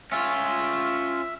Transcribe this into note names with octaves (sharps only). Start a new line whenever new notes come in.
C#4 F4 E5